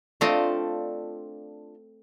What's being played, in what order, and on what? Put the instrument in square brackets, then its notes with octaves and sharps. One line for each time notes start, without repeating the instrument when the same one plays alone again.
[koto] A3 C4 D#5 [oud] D4 F4